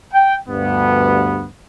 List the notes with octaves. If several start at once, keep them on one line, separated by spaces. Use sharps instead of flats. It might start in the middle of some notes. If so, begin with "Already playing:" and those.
G5
D2 G2 B3